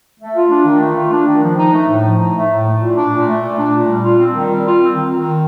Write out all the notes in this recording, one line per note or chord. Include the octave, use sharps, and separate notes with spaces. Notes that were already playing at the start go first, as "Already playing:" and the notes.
A3
F4
D4
D#3
A3
F4
D4
D#3
F3
D#4
A3
A2
F3
D#4
A3
A2
A3
A#2
D4
A#2
A3
A#2
D4
A#2
G3
F4
C4
D#3
G3
F4
C4
D#3
D#3